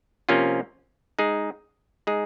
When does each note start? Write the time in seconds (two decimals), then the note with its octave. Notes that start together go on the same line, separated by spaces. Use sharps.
0.29 C3 F3 A#3 C#4 F4
1.19 G#3 D#4 G#4
2.07 G#3 D#4 G#4